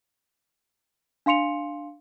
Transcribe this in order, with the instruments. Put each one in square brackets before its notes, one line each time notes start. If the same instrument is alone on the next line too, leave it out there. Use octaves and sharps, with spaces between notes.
[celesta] D4 F5 C6 C#7 F7